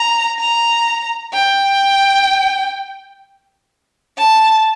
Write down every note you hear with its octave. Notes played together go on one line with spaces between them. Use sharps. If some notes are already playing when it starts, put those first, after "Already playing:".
Already playing: A#5
A#5
G5
A5